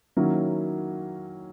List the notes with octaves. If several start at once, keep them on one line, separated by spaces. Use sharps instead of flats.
D#3 F#3 A#3 C#4 E4